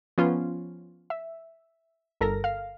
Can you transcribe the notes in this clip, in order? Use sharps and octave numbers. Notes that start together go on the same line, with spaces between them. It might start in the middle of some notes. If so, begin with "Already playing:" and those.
F3 B3 C#4 F4
E5
G1 A4 A#4 A#6
F5